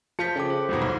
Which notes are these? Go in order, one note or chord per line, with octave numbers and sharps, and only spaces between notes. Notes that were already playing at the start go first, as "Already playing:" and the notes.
F3 F4 A5 G6 B6 C#7
C#3 A4 G5 D6
C5
D#1 G#1 B2 F#3
C2